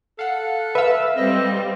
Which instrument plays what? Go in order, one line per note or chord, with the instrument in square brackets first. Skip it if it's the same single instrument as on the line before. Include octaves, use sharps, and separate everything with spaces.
[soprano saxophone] A4 [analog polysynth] F5 F#5
[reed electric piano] B4 F5 [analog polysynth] E5 E6
[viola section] G3 C4 [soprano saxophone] D#5